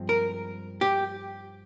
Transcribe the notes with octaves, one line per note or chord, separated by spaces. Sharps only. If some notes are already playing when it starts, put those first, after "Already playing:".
Already playing: G2 F3 G#3 C4
A#4
G4